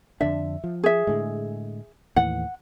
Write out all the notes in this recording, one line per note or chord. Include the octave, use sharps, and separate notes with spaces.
F2 D3 D4 E5
F3
G#4 E5
A2 D3 G#3
D#2 A2 E3 F#5